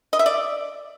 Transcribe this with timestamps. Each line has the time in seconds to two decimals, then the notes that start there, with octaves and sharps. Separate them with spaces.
0.13 D#5
0.19 E5
0.26 D5